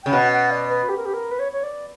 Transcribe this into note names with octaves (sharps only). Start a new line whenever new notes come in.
C#3 G5
B2 F#5
F#5
D5
B4
G4
A#4
G4
A#4
B4
C#5
C#5
D5